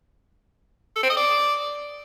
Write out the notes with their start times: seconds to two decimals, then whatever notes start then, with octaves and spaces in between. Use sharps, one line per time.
0.96 A4
1.03 C4
1.10 D#5
1.17 D5